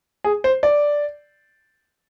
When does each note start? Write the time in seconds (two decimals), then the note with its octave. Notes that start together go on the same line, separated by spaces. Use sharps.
0.24 G#4
0.44 C5
0.63 D5